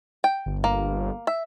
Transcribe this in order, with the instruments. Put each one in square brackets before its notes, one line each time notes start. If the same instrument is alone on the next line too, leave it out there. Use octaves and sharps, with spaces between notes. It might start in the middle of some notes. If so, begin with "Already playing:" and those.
[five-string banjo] G5
[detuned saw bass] G1
[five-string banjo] A#3
E5